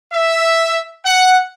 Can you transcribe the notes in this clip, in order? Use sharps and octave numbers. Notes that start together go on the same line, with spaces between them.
E5
F#5